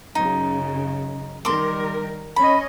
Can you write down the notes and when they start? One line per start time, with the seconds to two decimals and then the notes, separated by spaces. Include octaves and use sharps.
0.15 F#2 C#3 D#4
1.45 D#3 G3 A#4 C6 D6
2.36 C#4 D#5 B5